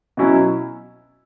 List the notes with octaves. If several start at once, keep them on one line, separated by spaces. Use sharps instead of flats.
B2 F#3 C#4 E4